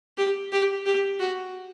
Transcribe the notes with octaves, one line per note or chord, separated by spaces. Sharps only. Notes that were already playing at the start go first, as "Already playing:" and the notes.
G4
G4
G4
F#4